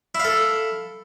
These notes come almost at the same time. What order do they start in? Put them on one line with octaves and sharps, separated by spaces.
E4 F5 A4